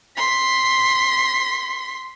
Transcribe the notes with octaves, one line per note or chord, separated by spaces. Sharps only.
C6 B6